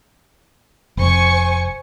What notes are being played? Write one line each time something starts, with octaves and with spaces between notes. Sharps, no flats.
F1 C5 G#5 C#6